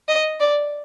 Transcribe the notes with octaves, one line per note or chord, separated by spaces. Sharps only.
D#5
D5